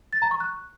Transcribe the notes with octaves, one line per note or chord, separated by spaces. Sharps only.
A6
A#5
C#6
F#6